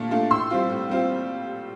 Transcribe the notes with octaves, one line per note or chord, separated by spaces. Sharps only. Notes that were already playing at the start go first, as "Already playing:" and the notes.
Already playing: A#2 A3 D4 F4 A5
A3 D4 F4
A2 C6 E6
G3 C4 F4
A2
G3 C4 F4